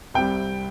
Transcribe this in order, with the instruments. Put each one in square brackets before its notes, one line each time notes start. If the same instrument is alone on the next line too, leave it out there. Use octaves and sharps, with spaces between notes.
[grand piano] C2 C3 G3 G5